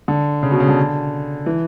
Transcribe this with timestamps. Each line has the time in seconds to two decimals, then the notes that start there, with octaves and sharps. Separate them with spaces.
0.08 D3
0.43 C#3
0.51 B2
0.60 C#3
0.68 D3
1.46 E3